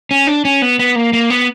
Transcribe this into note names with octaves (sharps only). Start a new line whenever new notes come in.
C#4
D4
C#4
B3
B3
A#3
A#3
B3